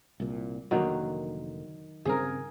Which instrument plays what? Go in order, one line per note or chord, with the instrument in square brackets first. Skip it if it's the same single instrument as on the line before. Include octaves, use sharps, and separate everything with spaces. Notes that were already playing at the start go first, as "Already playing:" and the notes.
[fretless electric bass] C2 A#2
[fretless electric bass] F1 D3 A#3 [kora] D#3 F#3
[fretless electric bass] G2 C#3 C4 [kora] G#4 A#4